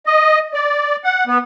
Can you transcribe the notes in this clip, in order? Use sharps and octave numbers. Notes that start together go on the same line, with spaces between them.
D#5
D5
F#5
B3